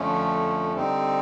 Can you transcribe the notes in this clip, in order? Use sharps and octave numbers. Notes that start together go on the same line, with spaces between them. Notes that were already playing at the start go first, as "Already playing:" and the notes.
Already playing: F2 D3 F3 A3 C#4
D3 G3 C4 D#4